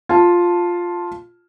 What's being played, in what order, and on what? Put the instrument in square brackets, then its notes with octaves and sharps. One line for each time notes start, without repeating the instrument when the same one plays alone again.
[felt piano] F4 A5